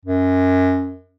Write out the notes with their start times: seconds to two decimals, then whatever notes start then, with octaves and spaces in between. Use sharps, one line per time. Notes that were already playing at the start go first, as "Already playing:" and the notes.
0.05 F#2